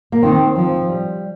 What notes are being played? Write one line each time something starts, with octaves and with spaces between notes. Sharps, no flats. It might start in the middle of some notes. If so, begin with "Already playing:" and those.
A#3
D#3 C4
F3 C4
G3